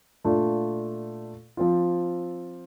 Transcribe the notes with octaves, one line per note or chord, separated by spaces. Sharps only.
A#2 A3 D4 F4
F3 C4 F4